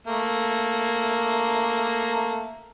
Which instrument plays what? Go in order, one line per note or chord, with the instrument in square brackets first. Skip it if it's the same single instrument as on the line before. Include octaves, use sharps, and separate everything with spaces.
[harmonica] A3 A#3